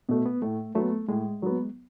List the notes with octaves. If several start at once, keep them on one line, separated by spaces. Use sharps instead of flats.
B2 A3 B3
B3
A2 A3
F#3 A3 B3
A2 G#3
F#3 B3